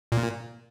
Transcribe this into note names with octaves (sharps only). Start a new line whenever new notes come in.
A#2